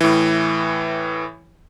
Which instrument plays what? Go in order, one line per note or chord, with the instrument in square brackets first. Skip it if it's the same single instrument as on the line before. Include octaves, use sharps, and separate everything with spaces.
[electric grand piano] A2 E3